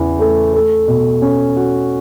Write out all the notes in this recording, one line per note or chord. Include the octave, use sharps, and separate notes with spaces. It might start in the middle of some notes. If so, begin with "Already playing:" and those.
Already playing: E2 C#3 E3
A3
A3
B2
C#4
F#4